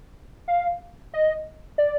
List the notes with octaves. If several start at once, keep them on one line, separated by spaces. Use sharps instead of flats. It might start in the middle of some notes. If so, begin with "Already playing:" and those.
F5
D#5
D5